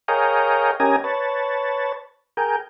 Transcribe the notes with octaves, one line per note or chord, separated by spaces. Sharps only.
G#4 A#4 C#5 D#5 F5 G5
C#4 G4 A#4 D#5 G#5
B4 C#5 A5
G#4 A#4 G5